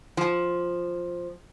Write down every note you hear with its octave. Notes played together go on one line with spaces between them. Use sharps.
F3